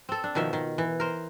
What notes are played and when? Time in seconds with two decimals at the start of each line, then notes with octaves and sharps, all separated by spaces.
0.09 C4 A4
0.24 D4
0.35 B2 D#3 F3 E5
0.53 D#3
0.78 E3
1.00 A#4 C5